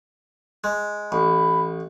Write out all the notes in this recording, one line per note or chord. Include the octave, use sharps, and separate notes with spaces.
G#3
A1 B5